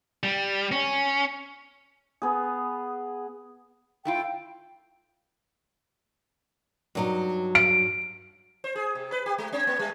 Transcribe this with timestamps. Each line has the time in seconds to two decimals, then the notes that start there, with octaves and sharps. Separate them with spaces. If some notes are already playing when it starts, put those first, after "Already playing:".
0.23 G3
0.72 C#4
2.22 B3 G#4
4.05 A3 E4 F4 G5
6.95 G2 F#3 D#4
7.55 D7
8.64 C5
8.76 G#4
8.95 C3
9.12 B4
9.26 G4
9.38 G#3
9.52 C4
9.67 A#3
9.79 G3